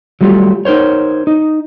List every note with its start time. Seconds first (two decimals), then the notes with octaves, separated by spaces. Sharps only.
0.21 F#3 G3 A3 F4 G4
0.65 D#4 A#4 C5 C#5
1.27 D#4